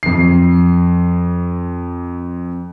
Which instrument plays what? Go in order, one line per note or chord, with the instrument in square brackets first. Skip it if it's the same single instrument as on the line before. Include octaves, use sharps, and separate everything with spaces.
[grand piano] F2 C7